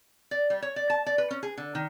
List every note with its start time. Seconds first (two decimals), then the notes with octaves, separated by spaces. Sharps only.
0.31 D5
0.50 G3
0.62 C#5
0.76 D5
0.90 A5
1.06 D5
1.18 B4
1.31 C#4
1.43 G#4
1.57 D3
1.75 D#3